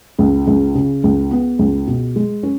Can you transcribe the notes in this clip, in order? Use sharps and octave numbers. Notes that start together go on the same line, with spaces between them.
C#2
C#2
C#3
C#2
B3
C#2
B2
G#3
C#4